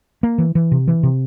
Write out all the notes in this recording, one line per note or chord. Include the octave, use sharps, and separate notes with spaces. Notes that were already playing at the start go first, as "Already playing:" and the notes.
A#3
E3
E3
C3
E3
C3